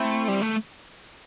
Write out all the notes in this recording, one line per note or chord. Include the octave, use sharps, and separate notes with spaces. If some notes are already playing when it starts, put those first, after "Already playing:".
Already playing: A3 C4 E4
G3
A3